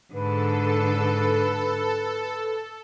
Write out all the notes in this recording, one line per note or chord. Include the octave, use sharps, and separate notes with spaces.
G#2 D3 A4 B4